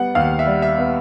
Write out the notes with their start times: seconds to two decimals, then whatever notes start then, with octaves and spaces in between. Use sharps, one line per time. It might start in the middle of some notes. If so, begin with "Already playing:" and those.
Already playing: G3 B3 F#5
0.15 D#2 F5
0.39 E5
0.46 G3
0.62 E5
0.78 B3